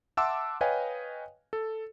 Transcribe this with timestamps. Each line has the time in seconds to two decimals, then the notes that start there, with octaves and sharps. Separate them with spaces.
0.17 E5 F#5 A5 C6 D6 E6
0.61 B4 C#5 D#5 F5 G5 G#5
1.53 A4